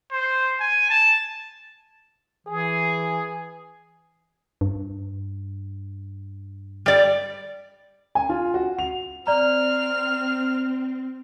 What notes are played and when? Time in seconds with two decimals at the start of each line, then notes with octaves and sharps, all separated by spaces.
0.12 C5
0.60 G#5
0.90 A5
2.47 E3 G#4
4.61 G2
6.86 G3 D5
8.15 G#5
8.29 F4
8.54 F#4
8.79 F7
9.27 C4 D5 A#5 F6